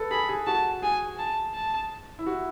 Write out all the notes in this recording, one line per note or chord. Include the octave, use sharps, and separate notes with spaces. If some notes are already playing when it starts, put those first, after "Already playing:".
Already playing: A4 B4
G#4 B5
G#4
F#4 A5
G#4 G#5
A5
A5
E4
F#4